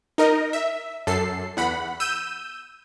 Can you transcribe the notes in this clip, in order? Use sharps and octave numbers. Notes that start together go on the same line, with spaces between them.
D#4 A#4 D#5
E5
F#2 A4 C7
E2 F#5 B5
E6 G6 D#7